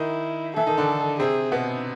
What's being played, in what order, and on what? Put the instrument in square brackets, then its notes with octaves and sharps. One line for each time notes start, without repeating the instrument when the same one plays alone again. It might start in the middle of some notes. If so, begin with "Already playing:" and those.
Already playing: [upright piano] D#3 D#4 [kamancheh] E4
[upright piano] E3 E4 [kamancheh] A4
[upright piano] D#3 D#4
D3 D4
[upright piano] C3 C4 [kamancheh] G#4
[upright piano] B2 B3